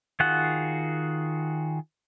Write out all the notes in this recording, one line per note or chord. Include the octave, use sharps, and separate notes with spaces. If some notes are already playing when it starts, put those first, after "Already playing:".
D#3 F4 F#4 G#4 F#5